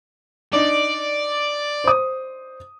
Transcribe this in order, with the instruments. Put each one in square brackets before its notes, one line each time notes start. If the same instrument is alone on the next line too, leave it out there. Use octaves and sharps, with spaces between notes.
[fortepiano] D4 D#4 [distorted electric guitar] D5
[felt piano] C5 D#6